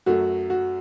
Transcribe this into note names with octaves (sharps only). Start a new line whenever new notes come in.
F#2 F#3 A3 F#4
F#4